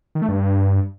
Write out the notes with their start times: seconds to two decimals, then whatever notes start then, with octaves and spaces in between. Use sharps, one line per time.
0.15 D#3
0.22 A3
0.28 G2